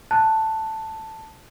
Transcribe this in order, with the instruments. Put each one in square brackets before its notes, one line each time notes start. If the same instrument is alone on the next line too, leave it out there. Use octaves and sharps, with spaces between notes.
[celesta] A5 F#6